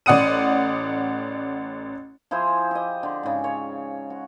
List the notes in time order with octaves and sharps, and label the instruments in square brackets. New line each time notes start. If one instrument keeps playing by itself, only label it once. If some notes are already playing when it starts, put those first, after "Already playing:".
[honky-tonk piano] A1 D5 F#5 D#6 D#7
[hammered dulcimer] F3 E4 G#4 C5
G4 D#5
D3
G#2 C#3
C#5
F#4